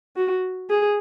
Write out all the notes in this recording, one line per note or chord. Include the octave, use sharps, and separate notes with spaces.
F#4
G#4